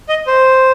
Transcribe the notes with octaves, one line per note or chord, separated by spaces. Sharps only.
D#5
C5